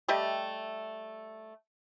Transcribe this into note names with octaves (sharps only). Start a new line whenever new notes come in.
G3 A3 G4 D#5